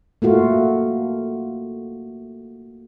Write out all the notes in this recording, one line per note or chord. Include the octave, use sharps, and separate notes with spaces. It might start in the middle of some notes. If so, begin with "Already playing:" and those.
A3 A#3 F4 F#4